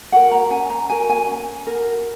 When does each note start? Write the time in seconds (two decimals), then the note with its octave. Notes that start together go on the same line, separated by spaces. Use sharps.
0.12 F#4 A#4 F#5
0.31 A#5
0.50 C#4 G#5
0.70 A#5
0.90 F#4 A#4 G#5
1.09 G#5
1.28 C#4
1.67 F#4 A#4